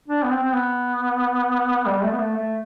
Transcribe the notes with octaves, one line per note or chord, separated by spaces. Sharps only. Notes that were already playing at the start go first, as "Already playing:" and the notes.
D4
B3
C4
C4
B3
G3
A3
B3
A3
A3